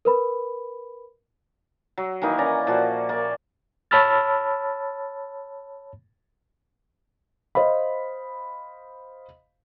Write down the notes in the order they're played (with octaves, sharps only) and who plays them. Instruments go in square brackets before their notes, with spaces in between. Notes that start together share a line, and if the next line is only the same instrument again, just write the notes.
[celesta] A#4 B4 B5
[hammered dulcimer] F#3
D#3 E3 A#3 D#4
C#4 D5 A#5
A#2 F3 F#4
A#3 D5
[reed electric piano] C#5 A5 B5 E6 F6 A6
[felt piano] C5 D#5 F5 B5